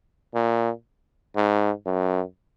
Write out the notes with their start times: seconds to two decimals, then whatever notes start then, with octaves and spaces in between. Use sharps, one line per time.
0.35 A#2
1.36 G#2
1.86 F#2